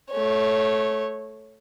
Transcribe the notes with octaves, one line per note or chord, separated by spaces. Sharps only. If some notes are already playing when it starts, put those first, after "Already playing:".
A3 C#5